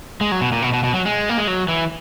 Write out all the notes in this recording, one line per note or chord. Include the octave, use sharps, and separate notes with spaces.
G#3
F#3
B2
A#2
B2
B2
B2
F#3
G#3
A#3
G#3
F#3
E3